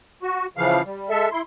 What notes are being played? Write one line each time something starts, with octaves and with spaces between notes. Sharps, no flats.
F#4
C#3 E3 F3 F5
G3
G#3 A4 E5
E4 C6